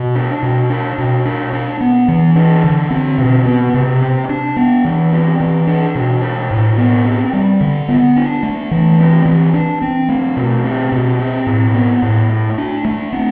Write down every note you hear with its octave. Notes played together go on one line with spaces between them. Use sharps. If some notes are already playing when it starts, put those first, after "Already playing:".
Already playing: B2
D4
B2
D4
B2
D4
D4
B3
E3
D4
D3
C4
B2
B3
C3
C4
D4
B3
E3
C4
E3
D4
B2
D4
A2
B3
C4
G3
D3
B3
D4
A3
E3
C4
E3
D4
C4
A3
B2
C4
B2
C4
A2
B3
A2
A3
D4
A3
C4